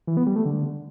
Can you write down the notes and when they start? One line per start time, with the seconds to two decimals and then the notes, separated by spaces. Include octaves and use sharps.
0.07 E3
0.17 B3
0.26 G3
0.36 A3
0.45 D3